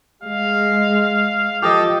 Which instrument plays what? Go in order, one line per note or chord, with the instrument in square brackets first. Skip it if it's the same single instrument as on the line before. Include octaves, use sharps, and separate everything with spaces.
[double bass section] G#3 [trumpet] F5
[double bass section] F3 [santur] G4 D#5 G5 [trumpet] A4